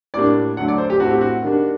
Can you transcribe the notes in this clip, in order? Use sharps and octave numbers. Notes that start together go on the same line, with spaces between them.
A2 G3 A#3 D4 D5
D3 F#3 A3 F#5
D5
C5
G4
A2 A3 C4 F#4
G4
F#4
D#3 G3 A#3 D4